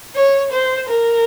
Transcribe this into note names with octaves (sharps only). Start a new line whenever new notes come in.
C#5
C5
A#4